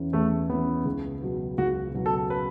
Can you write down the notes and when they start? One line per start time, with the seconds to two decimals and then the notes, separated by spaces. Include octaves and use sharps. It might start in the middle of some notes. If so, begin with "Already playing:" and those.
Already playing: E2 E3 C#4
0.13 E2 A3
0.50 E3 B3 C#4
0.85 C#2
1.22 B2 F#3
1.58 C#2 F#4
1.94 B2 F#3
2.06 A4
2.30 B4